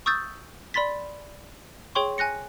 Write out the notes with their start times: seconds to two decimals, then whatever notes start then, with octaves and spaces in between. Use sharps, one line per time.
0.06 C#6 D#6 E6 G6 A6
0.74 D5 B5 C6 A6 B6
1.95 G#4 C#5 G5 C6 C#6
2.18 G#5 F#6 A#6 C#7